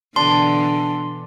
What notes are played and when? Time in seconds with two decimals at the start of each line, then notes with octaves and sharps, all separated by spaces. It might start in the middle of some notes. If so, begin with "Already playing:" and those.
0.16 B2 D3 E3 D4 C6